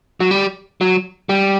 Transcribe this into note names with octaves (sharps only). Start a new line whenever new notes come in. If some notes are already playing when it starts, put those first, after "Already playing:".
F#3
G3
F#3
G3